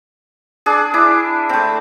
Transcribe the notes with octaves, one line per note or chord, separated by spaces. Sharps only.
D4 G#4
D4 E4
A3 C4